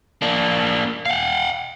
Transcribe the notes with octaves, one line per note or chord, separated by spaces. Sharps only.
A#3 D4
F5 F#5